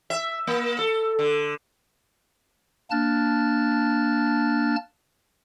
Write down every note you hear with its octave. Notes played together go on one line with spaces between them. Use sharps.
E5
A#3
A4
D3
A#3 D4 A5 F6 F#6 A6